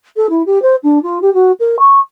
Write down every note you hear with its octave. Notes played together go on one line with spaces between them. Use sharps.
A4
E4
G4
C5
D4
F4
G4
F#4
A#4
C#6